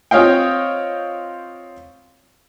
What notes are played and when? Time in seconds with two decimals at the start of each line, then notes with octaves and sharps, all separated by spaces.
0.11 C4 F4 C#5 D#5 F5 G5